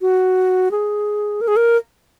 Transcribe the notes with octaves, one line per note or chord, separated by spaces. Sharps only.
F#4
G#4
A#4
G#4
A#4